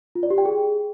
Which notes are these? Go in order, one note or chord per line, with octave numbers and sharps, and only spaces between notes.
F4
D5
G4
G5
G#4